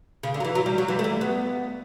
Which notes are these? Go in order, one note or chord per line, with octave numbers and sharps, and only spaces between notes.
C#3
D3
F#3
E3
F#3
G3
F#3
E3
A3
G3
B3